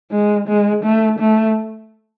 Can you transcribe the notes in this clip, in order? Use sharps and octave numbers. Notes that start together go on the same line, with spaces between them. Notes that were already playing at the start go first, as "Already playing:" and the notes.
G#3
G#3
A3
A3